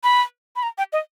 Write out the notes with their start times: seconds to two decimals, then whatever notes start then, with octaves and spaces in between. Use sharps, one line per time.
0.04 B5
0.56 B5
0.63 A#5
0.78 G5
0.93 D#5